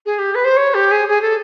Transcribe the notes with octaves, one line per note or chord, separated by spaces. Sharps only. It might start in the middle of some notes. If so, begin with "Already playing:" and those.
G#4
G4
B4
C5
C#5
G4
G#4
G#4
A4